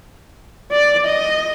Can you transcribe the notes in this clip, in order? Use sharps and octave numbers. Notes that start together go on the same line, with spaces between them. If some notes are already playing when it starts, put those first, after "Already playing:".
D5
D#5